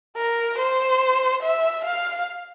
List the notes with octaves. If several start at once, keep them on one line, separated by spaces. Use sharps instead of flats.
A#4
C5
E5
F5